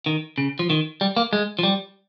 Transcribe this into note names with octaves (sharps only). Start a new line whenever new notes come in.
D#3
C#3
F3
D#3
G3
A#3
G#3
F3
G3